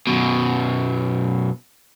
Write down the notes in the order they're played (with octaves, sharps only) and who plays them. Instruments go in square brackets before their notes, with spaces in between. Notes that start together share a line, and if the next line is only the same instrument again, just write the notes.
[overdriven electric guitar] F#2 B2